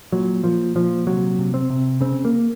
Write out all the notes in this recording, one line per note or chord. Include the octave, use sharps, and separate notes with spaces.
A#2 F#3
A#2 F3
A#2 F3
C3 F#3
C3
C4
C3
C#3 C4
A#3